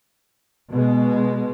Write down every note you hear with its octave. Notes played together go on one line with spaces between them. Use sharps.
B2 G#3